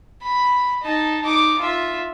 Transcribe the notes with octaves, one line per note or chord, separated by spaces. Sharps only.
B5
D#4 A5
D#4 D6
F4 E5